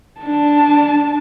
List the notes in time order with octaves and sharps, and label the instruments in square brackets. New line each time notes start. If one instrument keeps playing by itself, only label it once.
[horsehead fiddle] D4 A5